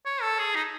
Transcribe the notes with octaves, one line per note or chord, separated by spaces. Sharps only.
C#5
A4
G#4
D#4